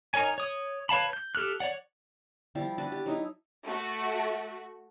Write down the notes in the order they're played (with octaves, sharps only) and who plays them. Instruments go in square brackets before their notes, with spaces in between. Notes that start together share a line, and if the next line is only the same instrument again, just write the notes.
[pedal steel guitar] D#4 A#4 C#5 G#5
C#5 D#6
B4 C#5 F5 A5 B5
G6
G4 A4 F6 F#6
C#5 D5 F#5
[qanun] F3 G3 E4 G4
D4 F#4 B4 A5
G4
F#3 D#4 E4
[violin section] A3 F#4